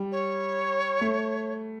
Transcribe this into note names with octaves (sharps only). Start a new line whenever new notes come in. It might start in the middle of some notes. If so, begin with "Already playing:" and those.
Already playing: G3
C#5
A3